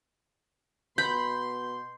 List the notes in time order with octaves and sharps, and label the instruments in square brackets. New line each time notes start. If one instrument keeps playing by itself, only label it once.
[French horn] B2 [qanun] B5 [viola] C6 [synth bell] G6